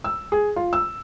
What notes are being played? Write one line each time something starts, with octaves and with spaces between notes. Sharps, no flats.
E6
G#4
F4
E6